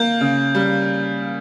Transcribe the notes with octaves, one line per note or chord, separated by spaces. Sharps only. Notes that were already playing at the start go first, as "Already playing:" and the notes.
Already playing: A#3 G6
C#3
G3